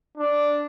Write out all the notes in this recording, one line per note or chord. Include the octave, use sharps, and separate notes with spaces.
D4